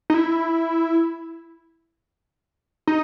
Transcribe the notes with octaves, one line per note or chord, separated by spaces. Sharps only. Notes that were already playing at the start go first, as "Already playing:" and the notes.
D#4
E4
D#4